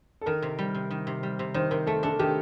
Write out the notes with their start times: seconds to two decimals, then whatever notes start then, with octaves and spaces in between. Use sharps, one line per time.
0.21 A4
0.26 D#3 A#4
0.42 C3
0.59 G3
0.75 C3
0.91 D#3
1.07 C3
1.23 G3
1.39 C3
1.54 D#3 C5
1.71 C3 A#4
1.87 A3 A4
2.03 D4 A4
2.19 D#3 G4